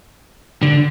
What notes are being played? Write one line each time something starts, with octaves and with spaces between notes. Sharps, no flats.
D3